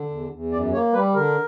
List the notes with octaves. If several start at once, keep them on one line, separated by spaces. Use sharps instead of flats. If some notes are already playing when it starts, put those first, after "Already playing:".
Already playing: D3
E2
E2
F#2 D5
A#3 C#5
G3 B4
D3 A#4